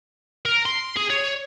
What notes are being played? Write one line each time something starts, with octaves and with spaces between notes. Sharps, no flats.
A#4
C6
G#4
C#5